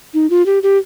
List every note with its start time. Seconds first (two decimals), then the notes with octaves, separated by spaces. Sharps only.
0.14 D#4
0.30 F4
0.46 G4
0.63 G4